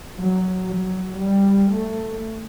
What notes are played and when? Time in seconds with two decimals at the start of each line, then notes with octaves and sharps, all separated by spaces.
0.18 F#3
0.69 F#3
1.20 G3
1.71 A3